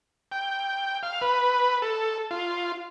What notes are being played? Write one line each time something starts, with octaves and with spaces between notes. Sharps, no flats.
G5
F5
B4
A4
F4